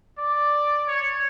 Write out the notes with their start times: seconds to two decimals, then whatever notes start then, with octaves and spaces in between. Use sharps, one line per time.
0.18 D5
0.88 C#5